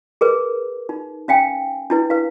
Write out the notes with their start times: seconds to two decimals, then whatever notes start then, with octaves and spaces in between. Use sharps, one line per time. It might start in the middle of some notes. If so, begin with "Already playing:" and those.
0.21 G#4 A#4 B4
0.89 D#4
1.28 C#4 F5 G5 G#5
1.90 D4 E4 B4
2.10 B4 F5